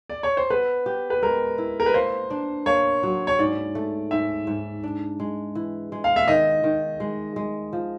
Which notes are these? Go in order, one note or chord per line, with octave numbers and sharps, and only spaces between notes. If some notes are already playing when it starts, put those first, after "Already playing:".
D5
C#5
C5
B3 B4
G4
B4
G#3 A#4
E4
A#4
B4
A#3 C5
D4
A#3 C#5
F#3
C#5
G#2 D5
A3
G#2 E5
G#2
D4
G#3
E3
G#3
F5
E5
D#3 D#5
D#3
G#3
G#3
F3